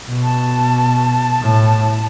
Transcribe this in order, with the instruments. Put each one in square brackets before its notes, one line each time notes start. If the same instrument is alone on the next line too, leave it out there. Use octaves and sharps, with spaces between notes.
[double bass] B2
[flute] A5
[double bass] A2